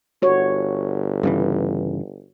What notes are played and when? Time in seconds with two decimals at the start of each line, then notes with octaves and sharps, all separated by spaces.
0.22 G1 F#4 C#5
1.23 G2 C#3 E3